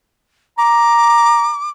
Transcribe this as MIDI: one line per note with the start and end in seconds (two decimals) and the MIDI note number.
0.58 1.56 82
0.58 1.70 86